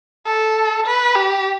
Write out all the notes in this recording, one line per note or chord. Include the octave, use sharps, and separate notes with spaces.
A4
B4
G4